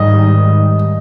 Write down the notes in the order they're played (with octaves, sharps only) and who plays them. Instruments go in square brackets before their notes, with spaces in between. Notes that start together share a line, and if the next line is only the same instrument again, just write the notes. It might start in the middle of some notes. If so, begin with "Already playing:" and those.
Already playing: [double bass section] G#2 D#3 G3 [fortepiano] D#5